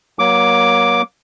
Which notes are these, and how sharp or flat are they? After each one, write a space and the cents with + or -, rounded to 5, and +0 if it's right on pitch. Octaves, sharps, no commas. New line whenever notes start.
F#3 +20 A#3 +35 D6 +0